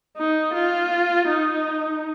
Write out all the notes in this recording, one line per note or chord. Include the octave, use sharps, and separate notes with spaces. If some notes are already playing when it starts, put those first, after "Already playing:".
D#4
F4
D#4